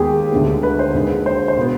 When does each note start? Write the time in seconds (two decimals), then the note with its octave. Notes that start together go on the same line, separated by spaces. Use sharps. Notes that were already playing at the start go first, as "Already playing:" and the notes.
Already playing: D#2 D#3 G#3 B3 G4 G#4
0.32 D2 D3 G#3 B3
0.63 B4
0.79 C5
0.94 D#2 D3 G#3
1.26 C5
1.48 C5
1.57 B2 B3